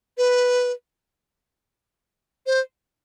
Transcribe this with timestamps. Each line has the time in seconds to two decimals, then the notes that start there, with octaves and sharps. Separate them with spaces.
0.18 B4
2.46 C5